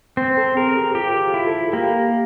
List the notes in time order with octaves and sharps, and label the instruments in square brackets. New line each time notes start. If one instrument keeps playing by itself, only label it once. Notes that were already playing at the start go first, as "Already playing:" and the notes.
[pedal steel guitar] C4 [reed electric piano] C5
[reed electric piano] A4
[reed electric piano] G#4 [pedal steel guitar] A#4
[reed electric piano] G4
[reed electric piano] F4 [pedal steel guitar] G4
[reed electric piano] F4
[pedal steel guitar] E4
[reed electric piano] A4
[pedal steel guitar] A#3 [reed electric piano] G4